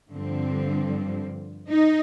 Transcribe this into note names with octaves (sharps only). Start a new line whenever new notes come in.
G2 D3 F3 C4
D#4